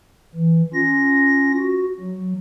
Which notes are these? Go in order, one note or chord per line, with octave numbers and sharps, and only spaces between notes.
E3
C#4 F4 A#6
F#4
F#3